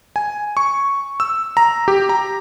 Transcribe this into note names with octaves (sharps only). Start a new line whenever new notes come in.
G#5
C#6
E6
A#5
G4
A#5